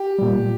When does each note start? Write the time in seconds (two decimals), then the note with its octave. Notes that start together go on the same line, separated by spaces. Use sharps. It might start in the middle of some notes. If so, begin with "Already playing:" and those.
Already playing: G4
0.19 A#2 G3